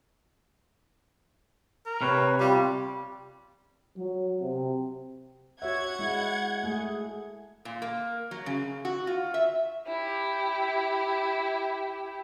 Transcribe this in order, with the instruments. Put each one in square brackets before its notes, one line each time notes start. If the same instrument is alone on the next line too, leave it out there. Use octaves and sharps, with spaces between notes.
[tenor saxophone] A#4
[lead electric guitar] C3 [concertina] B4 C#5
[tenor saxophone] G3 [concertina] F4 G4
[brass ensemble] F#3
C3
[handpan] F#4 C#5 E5 [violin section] F#5 G#6
[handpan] G#3 E4
A3 G#4
[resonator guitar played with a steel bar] A#2
A#3
F#3
C#3
F#4
F4
E5
[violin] E4 G4